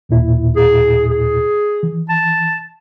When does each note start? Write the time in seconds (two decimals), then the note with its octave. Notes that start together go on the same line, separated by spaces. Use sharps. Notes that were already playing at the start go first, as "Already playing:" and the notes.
0.09 D#2 A#2 E4
0.56 G#4
1.10 G#4
1.83 E3
2.09 A5